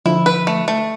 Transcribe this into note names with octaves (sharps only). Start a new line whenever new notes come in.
D3 F3 E4
B4
A3
A3